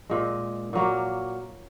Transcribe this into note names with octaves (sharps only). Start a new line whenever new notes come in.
A#2 G#3
A#2 F#3 A#3